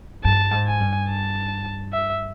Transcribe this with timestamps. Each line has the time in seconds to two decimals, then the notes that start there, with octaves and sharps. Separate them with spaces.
0.25 G2 A5
0.52 G#2
0.67 G#5
0.80 G2
1.09 A5
1.93 E5